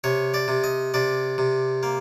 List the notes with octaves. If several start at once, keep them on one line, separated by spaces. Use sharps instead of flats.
C3 C#5
D5
C3
D#5
C3 D5
C3
A#3